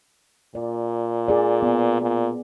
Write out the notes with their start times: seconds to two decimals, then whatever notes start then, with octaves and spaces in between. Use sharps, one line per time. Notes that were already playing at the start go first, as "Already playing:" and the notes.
0.55 A#2 D5
1.28 G#4 D5
1.62 B3
2.02 A#2